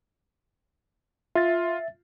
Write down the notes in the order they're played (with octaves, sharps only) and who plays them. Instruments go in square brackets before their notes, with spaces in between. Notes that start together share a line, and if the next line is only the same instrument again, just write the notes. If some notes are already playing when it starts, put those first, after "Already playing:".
[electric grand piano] F4 [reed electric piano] E5 A6